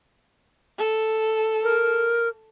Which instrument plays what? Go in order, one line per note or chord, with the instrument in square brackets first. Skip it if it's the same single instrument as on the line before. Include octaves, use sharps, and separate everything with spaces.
[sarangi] A4
[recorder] A#4